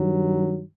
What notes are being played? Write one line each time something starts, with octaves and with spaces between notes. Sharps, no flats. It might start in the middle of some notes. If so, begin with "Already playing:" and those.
Already playing: G2 D#3 F#3